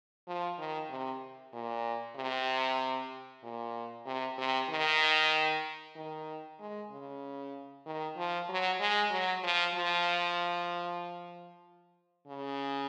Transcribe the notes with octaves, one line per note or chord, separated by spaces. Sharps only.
F3
D#3
C3
A#2
C3
A#2
C3
C3
D#3
D#3
G#3
C#3
D#3
F3
F#3
G#3
F#3
F3
F3
C#3